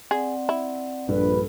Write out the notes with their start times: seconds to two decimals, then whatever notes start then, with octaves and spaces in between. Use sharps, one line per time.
0.11 C4 G#4 D5 F#5
0.49 E4
1.08 A#1 G2 A4 B4